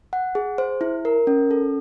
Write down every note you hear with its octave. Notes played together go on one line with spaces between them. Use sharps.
F#5
G#4
C5
E4
A#4
C#4
A4